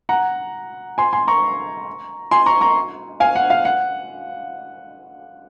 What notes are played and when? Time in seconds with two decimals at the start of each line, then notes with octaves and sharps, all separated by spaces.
0.09 F#5 A#5
0.98 G#5 C6
1.13 G#5 C6
1.28 A#5 C#6
2.31 G#5 C6
2.46 A#5 C#6
2.61 A#5 C#6
3.20 F5 G#5
3.36 F#5
3.50 F5
3.65 F#5